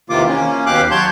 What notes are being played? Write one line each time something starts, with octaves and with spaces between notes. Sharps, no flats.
E2 C3 D#3 A#3 F4 D6
A#3 C#4
D#2 B2 G4 F5 D6 F#6
F#3 C#5 A5 C6 G6